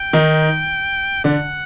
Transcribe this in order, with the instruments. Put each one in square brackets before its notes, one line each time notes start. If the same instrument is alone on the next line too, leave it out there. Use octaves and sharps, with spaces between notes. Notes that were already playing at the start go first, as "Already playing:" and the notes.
Already playing: [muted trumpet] G5
[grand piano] D#3 D#4
[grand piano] D3 D4 [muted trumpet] F#5